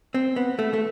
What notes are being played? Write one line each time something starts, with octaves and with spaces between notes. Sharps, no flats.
C4
B3
A3
A3